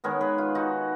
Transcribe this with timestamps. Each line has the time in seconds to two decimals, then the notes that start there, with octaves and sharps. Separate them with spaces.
0.04 D#3 G#3 B3 A#4 C#5
0.21 G#4 B4
0.38 F4
0.55 D#4 F#4